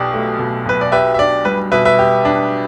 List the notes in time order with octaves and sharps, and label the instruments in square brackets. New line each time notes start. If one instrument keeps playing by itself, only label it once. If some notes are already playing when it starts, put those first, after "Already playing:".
Already playing: [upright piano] B1 B2 G4 [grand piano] D5
[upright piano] A3
B2
[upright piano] B1 [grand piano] B4
[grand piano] D5
[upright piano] G4 [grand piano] B4 E5
[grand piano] E5
[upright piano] D4 [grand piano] D5
[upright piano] G3 [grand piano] B4
[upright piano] B2 [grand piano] B4 E5
[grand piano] B4 E5
[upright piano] G4
D4